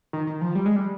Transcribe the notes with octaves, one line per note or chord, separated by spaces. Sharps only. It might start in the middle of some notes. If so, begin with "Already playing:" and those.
D#3
D#3
F3
G3
G#3
G3